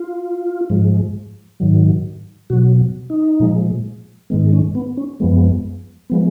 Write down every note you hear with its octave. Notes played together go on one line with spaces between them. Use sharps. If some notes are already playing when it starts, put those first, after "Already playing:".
Already playing: F4
G#2 F3 G#3
G#2 D#3 F#3
B2 F#3 F#4
D#4
A#2 F3 G#3
G#2 D#3 G#3 B3
C#4
B3
C#4
F#2 F3 G#3 B3
F3 G#3 B3